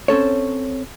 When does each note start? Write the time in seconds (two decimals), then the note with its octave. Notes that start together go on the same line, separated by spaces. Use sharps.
0.08 C4 C#4 A4 C#5